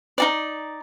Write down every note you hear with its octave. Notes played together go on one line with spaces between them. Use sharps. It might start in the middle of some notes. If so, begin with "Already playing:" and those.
D#4 F#4 D5